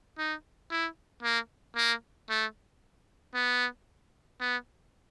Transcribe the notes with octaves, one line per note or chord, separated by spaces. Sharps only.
D#4
E4
A#3
A#3
A3
B3
B3